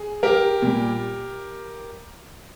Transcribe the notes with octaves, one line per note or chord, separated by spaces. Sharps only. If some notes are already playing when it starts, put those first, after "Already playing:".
Already playing: G#4
G4 A#4
A#2 G3